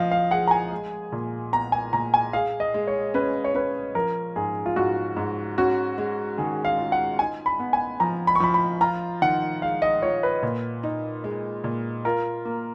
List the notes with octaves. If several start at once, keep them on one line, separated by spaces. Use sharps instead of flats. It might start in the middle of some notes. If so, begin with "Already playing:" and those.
Already playing: F3 D#5 F5
F5
G#4 F#5
A#5
G#5
G#3
A#2
B3 A#5
G#5
A#2 A#5
G#5
G#4 F5
D#5
G#3
C#5
C#4 B4
C#5
C#4 B4
F3 A#4
G#2 G#4
F4
G#2 F#4
G#2
C#4 F#4
G#3
D#3 G#4
F5
F4
F#5
D#4 G#5
B5
B3
G#5
F3 A#5
B5
C#6
F3 B5
B5
F4 A#5
D#3 F#5
G#3 F5
D#5
F4 C#5
B4
A#2
D#4
G#3
A#2
F4 A#4
A#3